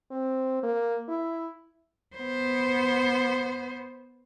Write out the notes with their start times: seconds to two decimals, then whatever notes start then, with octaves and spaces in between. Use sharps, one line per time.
0.11 C4
0.63 A#3
1.09 E4
2.16 B3 C5